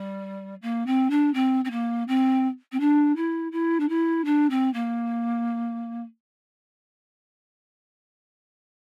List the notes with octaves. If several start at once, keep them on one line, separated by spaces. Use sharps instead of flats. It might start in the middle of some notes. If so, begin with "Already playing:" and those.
Already playing: G3
A#3
C4
D4
C4
C4
A#3
C4
C4
D4
E4
E4
D4
E4
D4
C4
A#3